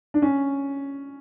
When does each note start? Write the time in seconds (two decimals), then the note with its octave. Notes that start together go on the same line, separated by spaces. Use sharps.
0.14 D4
0.22 C#4